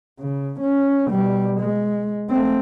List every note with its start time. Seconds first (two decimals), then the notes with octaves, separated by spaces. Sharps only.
0.19 C#3
0.60 C#4
1.08 B2 G3
1.60 G#3
2.30 A3 C4